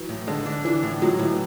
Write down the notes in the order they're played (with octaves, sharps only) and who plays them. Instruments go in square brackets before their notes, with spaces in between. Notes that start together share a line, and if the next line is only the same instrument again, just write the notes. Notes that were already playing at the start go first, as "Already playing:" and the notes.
Already playing: [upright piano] E3 F#3
[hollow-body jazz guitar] A2
[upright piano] D3 [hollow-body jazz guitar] G#3
[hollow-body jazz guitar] D4
[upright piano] E3 [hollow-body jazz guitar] D4
[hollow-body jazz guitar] A2
[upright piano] F#3 [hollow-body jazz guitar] G#3
[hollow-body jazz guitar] A2 [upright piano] E3